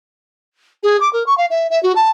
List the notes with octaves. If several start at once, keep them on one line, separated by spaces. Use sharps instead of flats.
G#4
D6
A#4
C#6
F5
E5
E5
F#4
A5